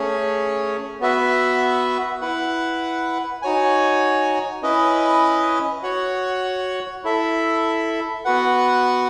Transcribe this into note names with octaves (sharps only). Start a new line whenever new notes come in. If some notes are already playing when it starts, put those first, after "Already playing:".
Already playing: A3 C#4 G#4 C#5
B3 F#4 B4 E5
E4 B4 F#5
D#4 F#4 C#5 G#5
C#4 E4 B4 D#5
F#4 C#5 F#5
E4 A4 E5
B3 F#4 B4 F#5